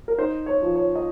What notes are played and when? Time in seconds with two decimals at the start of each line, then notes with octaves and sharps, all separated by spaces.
0.08 A#4
0.18 D#4 C5
0.46 C#5
0.62 F3
0.76 C#5
0.96 D#5